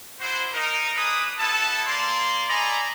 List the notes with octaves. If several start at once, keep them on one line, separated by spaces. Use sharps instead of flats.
D4 E4 F#4 C5
D#4 A#4
D4 G#4 B4 D#6
B3 E4 A4 A5
A#3 D5 C6
A4 D5 D#5 G#5 A#5 B5